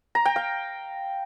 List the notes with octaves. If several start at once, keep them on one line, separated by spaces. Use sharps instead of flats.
A#5
G5
F5